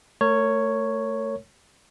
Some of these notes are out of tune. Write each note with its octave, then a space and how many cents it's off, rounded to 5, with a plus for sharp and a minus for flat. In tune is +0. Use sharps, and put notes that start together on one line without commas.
A3 +10 A#4 -30 C#5 +0